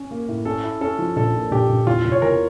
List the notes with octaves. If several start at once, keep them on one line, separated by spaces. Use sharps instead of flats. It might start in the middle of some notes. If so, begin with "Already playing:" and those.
Already playing: C#4
A#3
A2
C#4 A4
E4
C#4 A4
F3
A#1 A4
A#2
A#1 G4
A#1
E2 F4
F1
C#5
E2 A#4